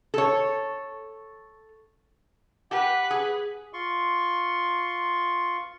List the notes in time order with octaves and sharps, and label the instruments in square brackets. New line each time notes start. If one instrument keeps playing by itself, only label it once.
[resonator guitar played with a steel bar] A4 C#5
[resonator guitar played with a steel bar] G4 [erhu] B4 [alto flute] F#5
[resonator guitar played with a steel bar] G#4
[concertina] F4 C6 C#6